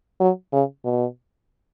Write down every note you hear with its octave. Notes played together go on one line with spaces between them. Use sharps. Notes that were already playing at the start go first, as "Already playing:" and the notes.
F#3
C#3
B2